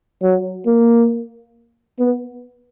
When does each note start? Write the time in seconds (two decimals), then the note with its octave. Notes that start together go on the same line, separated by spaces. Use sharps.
0.22 F#3
0.66 A#3
1.99 B3